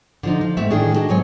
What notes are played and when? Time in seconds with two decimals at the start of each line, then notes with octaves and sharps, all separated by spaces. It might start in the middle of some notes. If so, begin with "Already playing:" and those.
0.23 D3 F3 D#4
0.41 F3
0.57 G#2 A3 C4 E5
0.70 A2 D#3 E3 D4 G#4
0.95 D4 F#4 D#5 A5
1.09 G#2 B2 F#3 C#5 G#5